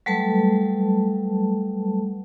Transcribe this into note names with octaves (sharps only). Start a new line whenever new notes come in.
F#3 G3 A3 A4 B4 A5